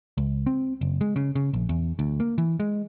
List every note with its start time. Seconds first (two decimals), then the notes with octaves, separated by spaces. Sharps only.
0.18 C#2
0.46 C4
0.81 F#1
1.01 G#3
1.16 C#3
1.35 C#3
1.53 A#1
1.69 E2
1.99 D2
2.20 A#3
2.38 E3
2.60 G#3